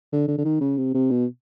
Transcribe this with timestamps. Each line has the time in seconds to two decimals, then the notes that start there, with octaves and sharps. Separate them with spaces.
0.12 D3
0.28 D3
0.38 D3
0.44 D#3
0.60 C#3
0.77 C3
0.94 C3
1.10 B2